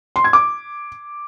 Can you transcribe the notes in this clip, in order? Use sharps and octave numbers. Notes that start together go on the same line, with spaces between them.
C6
G#6
D6